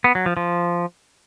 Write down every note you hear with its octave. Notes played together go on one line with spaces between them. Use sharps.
B3
F#3
F3
F3